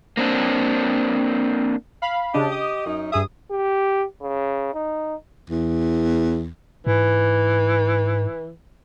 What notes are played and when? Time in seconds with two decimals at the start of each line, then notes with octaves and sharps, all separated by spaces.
0.17 A#3 C4 D4
2.02 F5 B5
2.34 C#3 D4 G4 D#5
2.52 D#6
2.86 F#2 D#4
3.12 G2 G#4 E5 D#6
3.51 G4
4.22 C#3
4.74 D#4
5.50 E2
6.87 G#2 E3